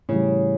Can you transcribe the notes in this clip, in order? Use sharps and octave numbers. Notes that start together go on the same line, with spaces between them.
A2 C#3 E3 G3